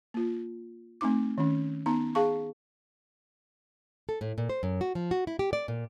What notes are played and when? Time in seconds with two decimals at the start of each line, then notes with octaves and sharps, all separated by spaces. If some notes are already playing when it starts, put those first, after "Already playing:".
0.14 A#3 F4
1.01 A3 C4 D#4 D6
1.38 D#3 C#4
1.86 B3 D#4 A#5
2.15 G#4 F5 A5 C#6
4.09 A4
4.21 A2
4.38 A#2
4.49 C5
4.63 F#2
4.81 F#4
4.95 F3
5.11 F#4
5.27 E4
5.39 G4
5.53 D5
5.68 A#2